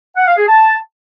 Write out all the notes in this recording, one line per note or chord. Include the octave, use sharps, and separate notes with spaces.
F#5
F5
G#4
A5